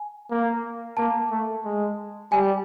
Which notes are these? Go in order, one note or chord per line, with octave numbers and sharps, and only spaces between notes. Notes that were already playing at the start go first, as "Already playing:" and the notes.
Already playing: G#5
A#3
A#3 A5
A3
G#3
G3 G#5